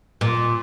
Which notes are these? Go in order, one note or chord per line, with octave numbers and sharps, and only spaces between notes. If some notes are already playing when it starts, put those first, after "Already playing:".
A#2